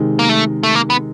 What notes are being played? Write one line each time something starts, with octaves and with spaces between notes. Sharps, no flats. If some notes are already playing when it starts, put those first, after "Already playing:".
Already playing: C3 D#3 G#3
A#3
A3
A3
A#3
B3